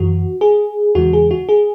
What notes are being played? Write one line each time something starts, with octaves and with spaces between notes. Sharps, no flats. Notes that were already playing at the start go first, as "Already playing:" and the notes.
Already playing: F#2 E3 F#4
G#4
E2 C#3 E3 G#3 F#4
G#4
F#4
G#4